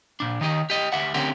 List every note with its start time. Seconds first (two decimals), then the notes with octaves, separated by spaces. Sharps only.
0.20 A#2 D4
0.41 D#3 D#4 G4 D#5
0.70 G4 D#5
0.92 D2 G4 E5 F#5
1.14 D2 D3 C4 C#4 G4 A#4